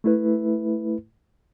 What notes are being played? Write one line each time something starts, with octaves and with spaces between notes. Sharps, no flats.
A3 E4 B4